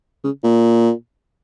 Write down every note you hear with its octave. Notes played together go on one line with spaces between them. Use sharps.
C#3
A#2